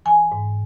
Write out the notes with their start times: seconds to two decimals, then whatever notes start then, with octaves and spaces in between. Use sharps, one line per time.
0.06 E3 G#5
0.32 G#2